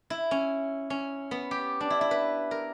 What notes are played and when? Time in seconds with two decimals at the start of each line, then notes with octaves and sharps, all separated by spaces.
0.10 E4
0.31 C#4
0.90 C#4
1.31 B3
1.51 G4
1.81 D4
1.90 E4
2.01 E4
2.11 B4
2.51 A#4